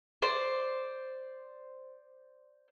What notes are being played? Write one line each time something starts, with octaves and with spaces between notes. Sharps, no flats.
C5 D5